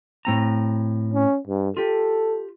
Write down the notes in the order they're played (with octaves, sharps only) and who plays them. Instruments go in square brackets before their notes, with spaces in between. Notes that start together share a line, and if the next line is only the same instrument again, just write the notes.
[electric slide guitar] A2 C4 A#5
[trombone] C#4
G2
[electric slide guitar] F4 G4 [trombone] A4